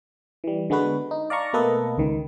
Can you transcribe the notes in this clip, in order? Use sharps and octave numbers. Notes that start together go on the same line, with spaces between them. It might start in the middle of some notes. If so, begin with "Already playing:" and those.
E3 G3
D3 G#3 B3 F#4 B4
D#4
D5 F5 A5 A#5 C#6
B2 A3 A#3 A4 B4 D#5
C#2 D#3